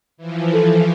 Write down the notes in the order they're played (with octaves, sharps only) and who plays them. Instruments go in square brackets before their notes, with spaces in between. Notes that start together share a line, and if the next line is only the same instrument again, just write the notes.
[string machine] E3 F3
[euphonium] A4